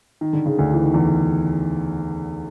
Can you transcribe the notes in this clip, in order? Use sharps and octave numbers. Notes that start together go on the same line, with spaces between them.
D#3
D3
C#3
D2 D3
E3
D#3
E2 E3